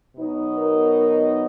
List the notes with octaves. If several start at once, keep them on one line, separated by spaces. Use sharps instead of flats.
B2 F#3 B3 D#4
A#4